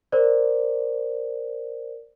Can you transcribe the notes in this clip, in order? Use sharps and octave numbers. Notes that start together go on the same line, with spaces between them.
A#4 C5 D5